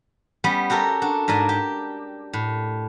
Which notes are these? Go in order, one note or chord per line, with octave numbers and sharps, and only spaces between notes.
G3 B3 C#4
F#4 G4 A4 A#4
D4 F#4
G#2 A#4 D5 G#5 A5
G4
A2